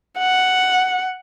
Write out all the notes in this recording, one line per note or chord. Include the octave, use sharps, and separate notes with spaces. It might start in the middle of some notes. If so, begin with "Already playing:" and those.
F#5